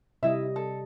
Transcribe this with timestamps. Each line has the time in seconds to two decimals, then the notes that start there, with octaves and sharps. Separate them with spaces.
0.23 C3 G3 E4 D#5 E5
0.56 A4